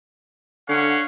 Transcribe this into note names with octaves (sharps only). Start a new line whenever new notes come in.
D3 C#4 F5 F#5